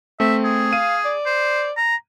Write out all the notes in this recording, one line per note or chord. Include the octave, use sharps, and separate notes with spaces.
A3 C4 E5
G#4
F5 D#7
D5
C5
A#5